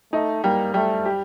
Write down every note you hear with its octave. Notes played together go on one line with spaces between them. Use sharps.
A3 D#4
G3 A#3
G3 A3
G4